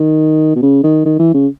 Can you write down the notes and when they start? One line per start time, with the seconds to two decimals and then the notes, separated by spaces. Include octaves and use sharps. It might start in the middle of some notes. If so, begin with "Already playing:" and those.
Already playing: D#3
0.56 B2
0.62 C#3
0.84 D#3
1.05 D#3
1.19 E3
1.34 C#3